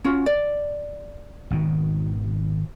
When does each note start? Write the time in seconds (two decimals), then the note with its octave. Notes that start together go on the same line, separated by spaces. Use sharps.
0.04 C#4 F4 F#4
0.26 D5
1.51 G#1 B2 D#3